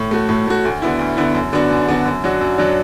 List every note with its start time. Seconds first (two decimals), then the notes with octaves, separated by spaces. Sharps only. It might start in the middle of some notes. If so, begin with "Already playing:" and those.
Already playing: A2
0.11 A3 F#4
0.29 A2
0.47 A3 F#4
0.65 D2
0.82 D3 B3 E4
0.99 D2
1.17 D3 B3 E4
1.34 F#2
1.53 D3 B3 D4 F#4
1.71 F#2
1.89 D3 B3 D4 F#4
2.05 F#2
2.24 F#3 D4 F#4
2.41 F#2
2.58 F#3 D4 F#4